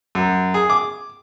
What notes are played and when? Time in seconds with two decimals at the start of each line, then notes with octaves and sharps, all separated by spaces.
0.15 F#2
0.54 G#4
0.70 D6